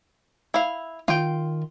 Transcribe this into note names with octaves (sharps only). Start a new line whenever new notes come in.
E4 F5
D#3 F4 G5